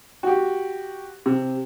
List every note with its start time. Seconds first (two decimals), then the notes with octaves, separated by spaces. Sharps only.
0.23 F#4 G4
1.26 C3